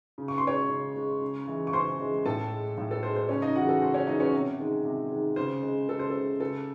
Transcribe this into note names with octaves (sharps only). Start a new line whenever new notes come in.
C#3
C#6
C6
G#3 C#5 C#6
C#3
G#3
C#3
E3 G#3
C#6
C#3 C5 C6
E3 G#3
A2 A4 A5
G#3
A2
A4
G#3 C5
C5
C#3 C#4 C#5
D#4 D#5
E3 G#3 F#4 F#5
A4
C#3 C5
C#4 C#5
E3 G#3 D#4 D#5
C#4 C#5
C3
D#3 G#3
C3
D#3 G#3
C#3 C5
G#3
C#3 A4
C5
A4
G#3
C#3 A4